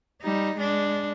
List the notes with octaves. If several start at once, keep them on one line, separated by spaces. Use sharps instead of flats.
G3 D#4
G#3 D4